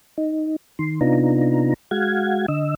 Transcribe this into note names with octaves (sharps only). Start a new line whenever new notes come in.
D#4
D#3 C6
C3 B3 D4 D#4 F4 A#5
G#3 F#4 F5 F#5 G#6
D3 D#5 E6